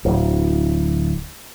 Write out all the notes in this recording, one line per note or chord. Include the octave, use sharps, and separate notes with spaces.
D1